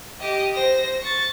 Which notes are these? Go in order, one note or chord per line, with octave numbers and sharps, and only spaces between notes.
G4 D#5
C5 A#6
C#6 A6